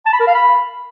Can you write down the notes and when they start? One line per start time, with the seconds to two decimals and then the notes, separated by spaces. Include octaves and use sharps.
0.06 A5
0.13 B5
0.20 A#4
0.27 F5
0.35 B5